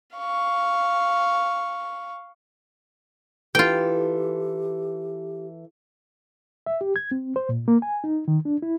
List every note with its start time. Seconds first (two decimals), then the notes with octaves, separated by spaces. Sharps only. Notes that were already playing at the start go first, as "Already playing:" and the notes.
0.17 F5 C#6
3.55 E3 F4 G4 A4 G5
6.66 E5
6.81 G4
6.96 G#6
7.11 C4
7.36 C5
7.49 A#2
7.68 A#3
7.82 G#5
8.04 D#4
8.28 D#3
8.45 D4
8.62 E4